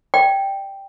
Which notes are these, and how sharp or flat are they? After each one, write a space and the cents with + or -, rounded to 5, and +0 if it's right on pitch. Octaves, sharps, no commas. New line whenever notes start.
D5 +30 G5 +0